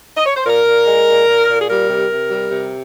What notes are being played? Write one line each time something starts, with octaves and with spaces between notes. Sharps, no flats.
D#5
C#5
C5
A#2 A#4
A#2
G#3
A#2
A#2
A#2
G#4
G3 A#4
C3
C3
G3
C3